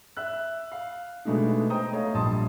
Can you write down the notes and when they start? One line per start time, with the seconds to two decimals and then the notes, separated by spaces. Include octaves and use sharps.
0.17 E5 E6 F#6
0.72 F5
1.25 B2 G#3 A3 D4 D#4
1.70 C5 D#5 G5 A#5 D#6
1.92 A3 C#5 D#5 F5
2.14 A#1 G3 A5 C6 D#6